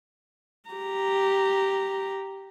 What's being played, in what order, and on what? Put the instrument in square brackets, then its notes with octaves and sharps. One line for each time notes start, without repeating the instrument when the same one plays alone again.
[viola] G4 A#5